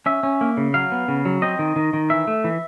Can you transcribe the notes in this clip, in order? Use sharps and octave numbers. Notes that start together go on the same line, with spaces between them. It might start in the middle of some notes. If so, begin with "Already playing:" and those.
C#4 E5
C#4
A#3
C#3
F#3 F5
B3
C#3
F#3
C4 D#5
D#3
D#3
D#3
E3 E5
A3
E3